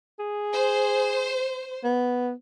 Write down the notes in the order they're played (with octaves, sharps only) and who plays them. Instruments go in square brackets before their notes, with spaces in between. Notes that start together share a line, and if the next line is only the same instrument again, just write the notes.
[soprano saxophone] G#4
[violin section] C5
[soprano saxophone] B3